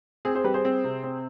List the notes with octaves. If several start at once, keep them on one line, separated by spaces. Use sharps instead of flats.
C4 G#4
G#4 C5
G3 G4 B4
G#4 C5
C4
C3
C4